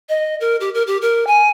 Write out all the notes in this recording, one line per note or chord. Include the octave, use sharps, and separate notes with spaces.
D#5
A#4
G4
A#4
G4
A#4
G#5